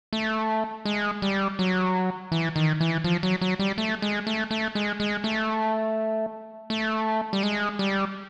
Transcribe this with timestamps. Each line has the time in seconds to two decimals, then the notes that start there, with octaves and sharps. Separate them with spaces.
0.13 A3
0.85 G#3
1.22 G3
1.59 F#3
2.32 E3
2.56 D#3
2.81 E3
3.04 F3
3.23 F#3
3.41 F#3
3.59 G3
3.78 A3
4.02 G#3
4.27 A3
4.51 A3
4.75 G#3
5.00 G#3
5.24 A3
6.70 A3
7.33 G3
7.43 G#3
7.79 G3